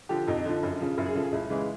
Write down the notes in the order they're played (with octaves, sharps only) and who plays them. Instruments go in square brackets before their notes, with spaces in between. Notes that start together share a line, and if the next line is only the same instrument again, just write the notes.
[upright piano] D3 F3 G4
F2 D#4
D3 F3
F#2
C#3 F3
F#2 E4
G#4
C#3 F3 A4
G#4
C#2 E4
C#3 E3 G#3